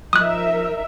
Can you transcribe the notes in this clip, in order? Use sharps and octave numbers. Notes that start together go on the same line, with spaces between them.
F3 D#4 A#4 E5 D#6 F#6